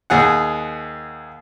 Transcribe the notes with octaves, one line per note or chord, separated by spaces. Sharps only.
D#2 G#4 F#5